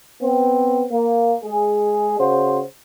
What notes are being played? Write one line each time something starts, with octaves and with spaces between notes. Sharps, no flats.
B3 C4
A#3
G#3 G#4
C#3 F#4 C5